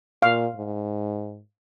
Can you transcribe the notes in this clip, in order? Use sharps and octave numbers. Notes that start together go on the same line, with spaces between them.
A#2 F5
G#2